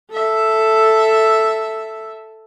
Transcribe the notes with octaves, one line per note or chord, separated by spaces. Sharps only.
A4 E5